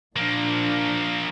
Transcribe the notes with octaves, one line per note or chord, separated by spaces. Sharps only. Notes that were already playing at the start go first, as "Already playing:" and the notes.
A#2 F3 A#3 D4